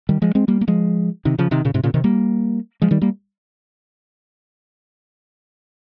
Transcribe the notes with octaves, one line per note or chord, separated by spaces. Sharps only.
D#3 G3
F3 G#3
G#3 C4
G3 A#3
A#3
F3 G#3
C3 D#3
C#3 F3
C3 D#3
A#2 C#3
G#2 C3
A#2 C#3
C3 D#3
G3 A#3
F3 G#3
D#3 G3
G3 A#3